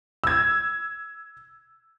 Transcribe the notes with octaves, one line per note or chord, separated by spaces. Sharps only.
E6 G#6